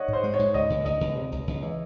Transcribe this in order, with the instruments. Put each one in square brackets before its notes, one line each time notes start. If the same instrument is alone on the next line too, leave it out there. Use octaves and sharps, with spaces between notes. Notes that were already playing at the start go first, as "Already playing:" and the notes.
Already playing: [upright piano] C#5 D#5 F#5
[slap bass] G#2 [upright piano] C5
[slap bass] G#3
[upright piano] C#5
[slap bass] G#2
[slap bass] C#2 [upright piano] D#5
[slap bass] C#2
[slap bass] C#2 [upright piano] D#5
[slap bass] C#2
C3
C#2
C#2
E3